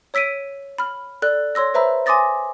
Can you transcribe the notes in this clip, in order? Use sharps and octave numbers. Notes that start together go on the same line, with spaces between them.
C#5 E6 B6 D7 D#7
B5 F6
A4 D5 F#6
C#5 C6 E6 A#6
B4 C5 E5 A#5 B5 E6
G#5 C6 D6 D#6 A6 A#6